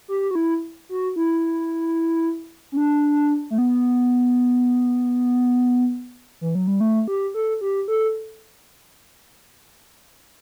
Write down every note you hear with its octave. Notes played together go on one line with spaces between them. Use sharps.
G4
F#4
E4
F#4
E4
C#4
D4
A3
B3
E3
F#3
G3
A3
G4
A4
G4
A4